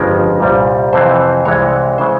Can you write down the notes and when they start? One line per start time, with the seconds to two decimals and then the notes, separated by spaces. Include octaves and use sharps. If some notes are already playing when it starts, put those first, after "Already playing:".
Already playing: G1 F2 C#3 F3 G#3 A#4
0.40 C2 A#2 G3
0.93 F2 C3 E3 C5
1.45 C2 C3 E3 G#3 C#5
1.98 C#3 E3 G#3 C5